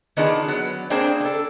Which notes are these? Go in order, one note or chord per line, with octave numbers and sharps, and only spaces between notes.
D#3 B3 D4 F4 G#4
F#3 B3
A#3 C4 D4 G#4
D4 A4